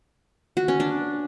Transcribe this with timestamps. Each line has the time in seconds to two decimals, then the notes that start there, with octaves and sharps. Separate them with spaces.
0.57 F#4
0.68 C#4
0.80 D4